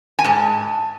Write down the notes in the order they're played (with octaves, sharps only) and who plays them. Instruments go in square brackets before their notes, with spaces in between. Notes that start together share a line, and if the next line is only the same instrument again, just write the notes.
[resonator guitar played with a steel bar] G#5
G#2 A5